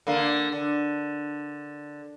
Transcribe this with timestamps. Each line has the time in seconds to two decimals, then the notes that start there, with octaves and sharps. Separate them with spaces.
0.07 D3 A#3
0.52 D3